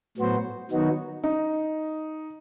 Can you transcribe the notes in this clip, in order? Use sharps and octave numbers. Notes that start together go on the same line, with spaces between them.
A2 F#3 B3 F#4 C5
D#3 F#3 B3 D#4 F#4
D#4